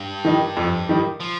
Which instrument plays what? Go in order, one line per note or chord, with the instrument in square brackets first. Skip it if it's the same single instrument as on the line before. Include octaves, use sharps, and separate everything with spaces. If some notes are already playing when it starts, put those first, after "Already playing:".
Already playing: [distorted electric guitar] G2
[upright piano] D#3 G3 D#4
F2
D#3 G3 D#4
[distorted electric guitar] F3